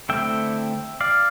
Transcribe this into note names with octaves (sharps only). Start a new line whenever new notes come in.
D3 A3 C4 E4 E5 G5
D5 F5